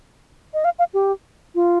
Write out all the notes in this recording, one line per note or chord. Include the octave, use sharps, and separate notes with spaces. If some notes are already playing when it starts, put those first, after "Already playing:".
D#5
F5
F5
G4
F4